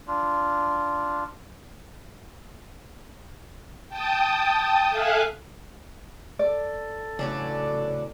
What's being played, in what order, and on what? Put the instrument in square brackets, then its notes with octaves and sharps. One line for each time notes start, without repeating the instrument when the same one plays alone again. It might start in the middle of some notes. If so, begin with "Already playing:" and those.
[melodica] D4 F4
[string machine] G5 A5 D#6
A4 E5 F5 G#5 F6 F#6
[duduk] A4 [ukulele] D5
[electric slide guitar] A2 C#3 [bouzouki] F#3 C#4 D4